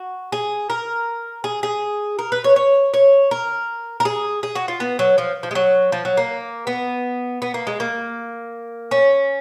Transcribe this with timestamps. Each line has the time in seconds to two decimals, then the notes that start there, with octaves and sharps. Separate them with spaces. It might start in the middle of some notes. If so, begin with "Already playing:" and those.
Already playing: F#4
0.32 G#4
0.70 A#4
1.44 G#4
1.63 G#4
2.19 A#4
2.32 B4
2.44 C#5
2.56 C#5
2.94 C#5
3.31 A#4
4.00 A#4
4.05 G#4
4.43 G#4
4.55 F#4
4.68 F4
4.80 B3
4.99 F#3
5.18 F3
5.43 F3
5.51 G#3
5.55 F#3
5.92 F3
6.05 F#3
6.17 A#3
6.67 B3
7.42 B3
7.54 A#3
7.67 G#3
7.80 A#3
8.91 C#4